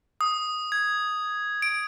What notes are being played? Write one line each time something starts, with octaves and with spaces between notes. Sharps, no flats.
D#6
G#6
D7